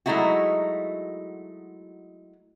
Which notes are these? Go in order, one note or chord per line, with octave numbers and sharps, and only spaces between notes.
F#3 G#3 A3 D#4 E4 F#4